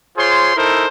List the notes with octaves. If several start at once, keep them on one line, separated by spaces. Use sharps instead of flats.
F4 G#4 C5 C#5 C6
D#4 E4 A4 A#4 C5